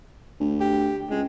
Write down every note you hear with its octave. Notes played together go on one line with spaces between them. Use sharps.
D2
G4
C#2 G#3